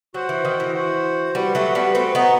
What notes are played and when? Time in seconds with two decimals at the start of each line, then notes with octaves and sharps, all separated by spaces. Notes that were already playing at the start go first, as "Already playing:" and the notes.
0.14 F#3 F#4 C5 F#5
0.29 E3
0.45 D#3
0.60 E3
0.75 F#4 C5 F#5
1.35 G3 F#4 B4 F#5
1.55 F#3 A3
1.75 G3 B3
1.95 A3 C4 F#4 B4 F#5
2.15 B3 D#4